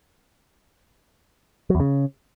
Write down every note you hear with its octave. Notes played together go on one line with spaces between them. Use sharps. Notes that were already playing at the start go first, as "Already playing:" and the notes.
F#3
E2
C#3